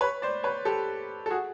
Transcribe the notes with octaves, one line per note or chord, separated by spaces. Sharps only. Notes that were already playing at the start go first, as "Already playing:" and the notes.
B4 C#5
C5 D5
B4 C#5
G4 A4
A4
F#4 G#4